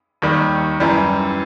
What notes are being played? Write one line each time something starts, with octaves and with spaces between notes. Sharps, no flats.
D#2 D#3 G3
F#2 E3 G3